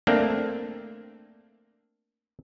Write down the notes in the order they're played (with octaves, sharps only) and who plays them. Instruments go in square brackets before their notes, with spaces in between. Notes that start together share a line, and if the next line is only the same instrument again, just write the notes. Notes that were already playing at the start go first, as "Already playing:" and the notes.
[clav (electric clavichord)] A3 A#3 C4 D4